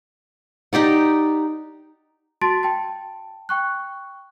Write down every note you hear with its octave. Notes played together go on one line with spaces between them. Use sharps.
D#4 G4 D5 F#5
F#4 A5 C6 A6 D7
G5 A5
G5 C#6 F#6